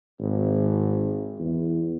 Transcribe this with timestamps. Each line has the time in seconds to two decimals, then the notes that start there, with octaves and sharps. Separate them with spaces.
0.19 G#1
1.39 E2